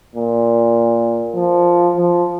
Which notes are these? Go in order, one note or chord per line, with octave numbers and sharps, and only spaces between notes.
A#2
F3
F3